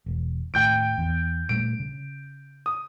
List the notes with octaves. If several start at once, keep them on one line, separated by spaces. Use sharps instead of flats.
E1
D#2 A2 G5 G6 D7
E2
A#2 G3 A3 D7
C#3
D#6